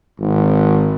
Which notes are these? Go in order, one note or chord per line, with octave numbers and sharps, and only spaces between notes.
G#1